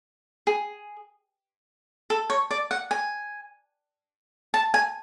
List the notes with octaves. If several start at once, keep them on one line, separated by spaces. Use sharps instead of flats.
G#4
A4
C#5
D5
F#5
G#5
A5
G#5